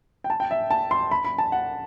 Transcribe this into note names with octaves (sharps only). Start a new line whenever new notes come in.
G5
A5
G5
E5
A5
C6
B5
B5
A5
F#5